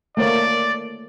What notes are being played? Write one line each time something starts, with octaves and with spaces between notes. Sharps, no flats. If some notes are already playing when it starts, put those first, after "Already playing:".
A3 A#3 C#5 D5